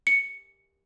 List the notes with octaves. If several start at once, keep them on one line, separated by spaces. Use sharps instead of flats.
C#7